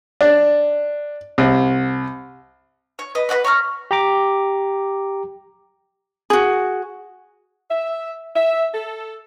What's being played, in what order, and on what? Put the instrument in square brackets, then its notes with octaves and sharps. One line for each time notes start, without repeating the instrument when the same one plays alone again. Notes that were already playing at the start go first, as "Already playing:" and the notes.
[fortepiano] D4
C2
[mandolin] C#5
B4 D#5
B4 D#5 F#5 B5
C#5 A#5 C#6 F6
[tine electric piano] G4 A#5 D6
[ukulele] F#4 G#4
[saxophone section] E5
E5
A4